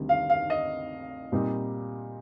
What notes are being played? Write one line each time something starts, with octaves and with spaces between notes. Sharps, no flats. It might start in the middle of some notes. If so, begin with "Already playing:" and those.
Already playing: D2 C3 D#3 G3
F5
F5
D#5
A#2 G3 C4 D#4